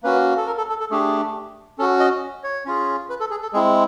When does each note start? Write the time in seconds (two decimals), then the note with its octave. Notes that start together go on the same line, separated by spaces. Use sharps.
0.03 A#3 C#4 F#4 B4
0.37 A4
0.47 A#4
0.58 A4
0.69 A4
0.80 A4
0.91 A3 D4 G4 G#4
1.78 C#4 A4
1.82 F#4
2.00 D#5
2.44 C#5
2.66 C#4 F4 G#4
3.09 B4
3.20 A4
3.31 G#4
3.42 A4
3.53 G#3 C4 E4 G#4